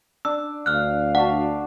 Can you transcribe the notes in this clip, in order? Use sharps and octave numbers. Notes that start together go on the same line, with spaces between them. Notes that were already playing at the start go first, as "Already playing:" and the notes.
D4 E6
D2 F5 F6 F#6
D4 F#4 F#5 A5